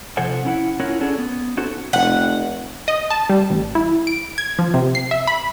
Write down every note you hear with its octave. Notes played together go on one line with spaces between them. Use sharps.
C3 F3 A4 C5 F#5 G#5
C#4 E4 F#5
C#4 E4 F4 A#4 C#5 F#5
C#4 D4 G#4 A4 C#5
B3
C#4 D#4 F#4 A4 C5
F1 F#5
D#5
A5
G3
A1
E4
D7
G#6
F3
C3
C7
E5
B5